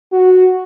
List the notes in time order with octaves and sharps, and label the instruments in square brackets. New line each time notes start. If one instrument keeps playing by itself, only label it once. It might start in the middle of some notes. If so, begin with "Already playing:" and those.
[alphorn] F#4